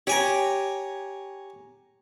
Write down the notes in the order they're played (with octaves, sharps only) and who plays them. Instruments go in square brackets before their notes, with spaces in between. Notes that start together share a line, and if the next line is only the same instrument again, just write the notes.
[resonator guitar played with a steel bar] G4 [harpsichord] C#5 G#5 A#5